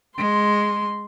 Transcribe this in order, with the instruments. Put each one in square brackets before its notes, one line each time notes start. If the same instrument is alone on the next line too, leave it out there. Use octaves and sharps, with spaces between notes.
[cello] G#3 [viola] C6